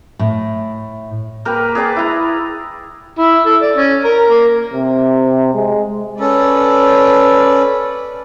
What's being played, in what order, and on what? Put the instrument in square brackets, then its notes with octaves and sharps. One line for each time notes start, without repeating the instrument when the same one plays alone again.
[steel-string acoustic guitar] A2
[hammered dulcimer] A#3 G4 A#4 B4
G#4 B4 D5
E4 A#5
[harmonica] E4
A4
D5
C#4
A#4
A#3
[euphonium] C3
G#3
[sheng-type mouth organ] C#4 A4 [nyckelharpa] B4 D5